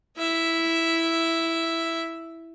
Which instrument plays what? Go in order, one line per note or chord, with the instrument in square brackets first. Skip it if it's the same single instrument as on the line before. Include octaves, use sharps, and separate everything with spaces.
[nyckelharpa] E4 E5